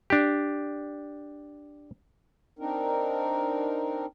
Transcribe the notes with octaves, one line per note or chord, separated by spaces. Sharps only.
D4 G4
C4 D4 D#4 A#4